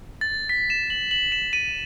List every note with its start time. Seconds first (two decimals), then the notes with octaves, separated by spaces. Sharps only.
0.21 A6
0.49 B6
0.70 E7
0.90 F#7
1.11 F#7
1.32 E7
1.53 D#7